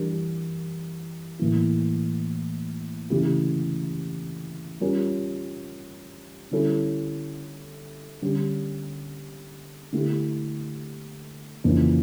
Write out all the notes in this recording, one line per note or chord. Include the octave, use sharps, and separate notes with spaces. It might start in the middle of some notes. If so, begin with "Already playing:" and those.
Already playing: E3 G3 D4 G4 A#4
A2 E3 A#3 E4
C#3 E3 A3 E4 G4
G3 C#4 F4 A#4
D3 G3 C#4 E4 A4
D3 G3 C#4 G4
D3 A3 E4 G4
F2 C#3 E3 A#3 D4